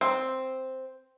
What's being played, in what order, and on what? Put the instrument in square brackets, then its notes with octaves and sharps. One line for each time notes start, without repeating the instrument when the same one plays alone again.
[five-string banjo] C4